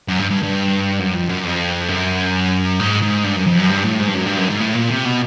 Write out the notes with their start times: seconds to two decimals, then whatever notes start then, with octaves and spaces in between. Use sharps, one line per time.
0.08 F#2
0.20 G2
0.31 G2
0.43 G2
0.99 F#2
1.15 F2
1.29 F#2
1.45 F2
1.89 F#2
2.80 G#2
3.02 G#2
3.24 G2
3.36 F#2
3.47 F2
3.59 F#2
3.70 G2
3.85 A2
3.99 G#2
4.08 G2
4.14 F#2
4.26 G2
4.37 F#2
4.49 G#2
4.60 A2
4.75 A#2
4.90 C3
5.05 B2